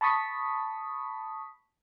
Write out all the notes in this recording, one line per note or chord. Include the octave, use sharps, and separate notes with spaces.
A5 B5 C#6 D#6 B6